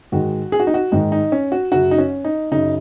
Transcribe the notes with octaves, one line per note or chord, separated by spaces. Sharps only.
G#2 D#3 G#3 F#4
G#4
F#4
D#4
F#4
G#2 D#3 G#3 D#4
D#4
C#4
F#4
F#2 C#3 F#3 F#4
D#4
C#4
D#4
F#2 C#3 F#3 D#4